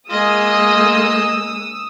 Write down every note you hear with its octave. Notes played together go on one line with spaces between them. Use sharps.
G#3 A#3 F4 G#4 D#5 D#6 E6